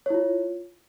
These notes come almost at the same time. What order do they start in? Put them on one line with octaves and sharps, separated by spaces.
C#5 E4 F4